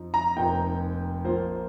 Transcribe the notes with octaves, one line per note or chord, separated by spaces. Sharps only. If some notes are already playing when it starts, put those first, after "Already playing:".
Already playing: F2 F3 D#4
A#5
F1 F2 F3 A#3 D#4 G5
A#1 A#2 A#3 F4 C5